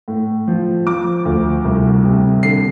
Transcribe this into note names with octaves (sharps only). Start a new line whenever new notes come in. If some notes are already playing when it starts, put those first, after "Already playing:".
A2
F3
F3 D6
D2
C2
C3
D3 C7